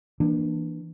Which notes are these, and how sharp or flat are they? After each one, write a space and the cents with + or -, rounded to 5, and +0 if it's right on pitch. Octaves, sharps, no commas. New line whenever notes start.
E3 +0 A#3 +25 D4 +20